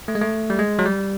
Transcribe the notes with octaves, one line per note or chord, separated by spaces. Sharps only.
A3
G#3
A3
G3
G#3
F#3
G3